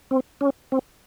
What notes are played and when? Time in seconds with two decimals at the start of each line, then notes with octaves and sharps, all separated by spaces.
0.11 C4
0.41 C#4
0.72 C4